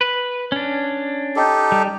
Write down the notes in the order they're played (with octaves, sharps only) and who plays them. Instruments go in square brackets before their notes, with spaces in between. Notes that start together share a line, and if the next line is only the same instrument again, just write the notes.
[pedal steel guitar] B4
C#4 D4
[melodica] D#4 G4 A4
[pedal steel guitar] G3